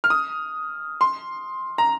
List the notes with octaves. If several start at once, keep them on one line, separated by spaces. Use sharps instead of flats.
F6
D#6
C6
A#5